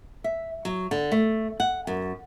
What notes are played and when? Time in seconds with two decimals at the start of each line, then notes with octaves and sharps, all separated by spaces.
0.24 E5
0.65 F#3
0.91 D3
1.12 A3
1.60 F#5
1.87 F#2